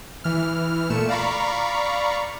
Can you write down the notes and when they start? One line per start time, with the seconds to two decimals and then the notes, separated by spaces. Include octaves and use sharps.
0.24 E3 F6
0.90 A#2 A3 C#7 E7
1.09 D5 F5 A#5 B5 C#6